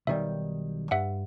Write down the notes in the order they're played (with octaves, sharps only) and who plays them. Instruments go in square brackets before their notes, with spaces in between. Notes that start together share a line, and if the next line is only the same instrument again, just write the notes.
[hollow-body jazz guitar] B1 D#3 G3 [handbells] E5
[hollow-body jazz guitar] G2 [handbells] E5 F#5